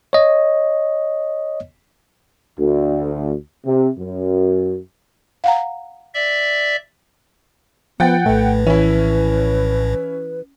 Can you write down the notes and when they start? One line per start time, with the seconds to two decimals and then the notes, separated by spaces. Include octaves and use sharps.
0.13 C#5 D#5
2.58 D2
3.64 C3
3.98 F#2
5.44 F5 F#5 A#5
6.14 D5 E5
8.00 F3 B3 F#5 G5 A6
8.26 A#1 A2 A3 B4
8.67 E3 C#4 E4